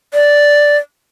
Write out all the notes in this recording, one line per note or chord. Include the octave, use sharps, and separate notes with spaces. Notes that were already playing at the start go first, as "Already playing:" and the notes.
D5